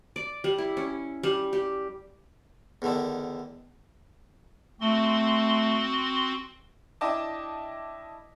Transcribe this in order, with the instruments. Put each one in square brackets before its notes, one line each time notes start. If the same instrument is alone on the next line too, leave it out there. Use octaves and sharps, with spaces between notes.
[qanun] D5
G3
E4
C#4
G3
G4
[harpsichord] E2 D3 D#3
[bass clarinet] A3 [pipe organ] C4 F#4 C6
[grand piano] D4 E4 D#5 G5 A5 D6